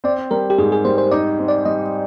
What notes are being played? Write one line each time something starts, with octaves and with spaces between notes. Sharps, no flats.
C4 D5
G3 A#4
G4
G#2 G#4
G#4
G3 C5
C5
D#4 D5
C4
D5
G3 D#5